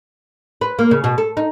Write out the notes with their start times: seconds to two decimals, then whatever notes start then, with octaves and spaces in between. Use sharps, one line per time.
0.61 B4
0.79 A#3
0.91 C#3
1.04 B2
1.18 A4
1.37 D#4